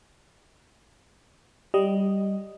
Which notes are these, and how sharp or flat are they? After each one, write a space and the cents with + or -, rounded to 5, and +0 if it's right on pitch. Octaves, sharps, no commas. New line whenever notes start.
G3 -5 D#5 +0